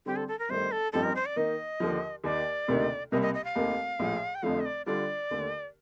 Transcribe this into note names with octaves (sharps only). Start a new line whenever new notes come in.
D3 G3 C4 G4
A4
A4
A#4
G1 G2 D#3 A3 C5
A4
A1 G2 F3 C4 D#4 A4
A#4
C5
D5
D#3 A#3 D#4 D#5
D#2 D3 F3
D#2 D#3 A#3 D5
D2 C3 D#3 A#3 D#4
C2 C3 G3 A#3 D#5
D#5
D#5
F5
F1 D#2 D#3 A#3
A#1 A2 F3 A3
G5
F1 F2 D3 F3 A3 F5
D#5
D5
D3 G3 D4 F4 A4 D5
D#2 D3 A3